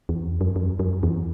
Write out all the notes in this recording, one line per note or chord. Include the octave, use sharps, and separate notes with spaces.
E2
F2
F#2
F#2
F#2
E2